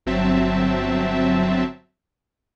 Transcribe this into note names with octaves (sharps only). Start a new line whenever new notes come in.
G1 F#3 C4 E5 A5